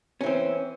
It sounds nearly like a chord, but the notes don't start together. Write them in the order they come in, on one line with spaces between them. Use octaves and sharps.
C#4 E3 C4